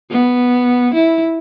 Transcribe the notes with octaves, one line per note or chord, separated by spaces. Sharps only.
B3
E4